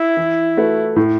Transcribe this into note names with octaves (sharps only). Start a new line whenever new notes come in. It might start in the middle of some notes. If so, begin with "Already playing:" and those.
Already playing: E4
E3
A3 F#4 B4
A2